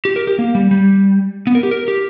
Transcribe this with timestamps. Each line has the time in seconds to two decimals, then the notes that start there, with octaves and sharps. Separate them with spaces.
0.05 G4
0.16 A#4
0.27 G4
0.39 A#3
0.55 G3
0.71 G3
1.47 B3
1.55 A#4
1.63 G4
1.71 A#4
1.88 G4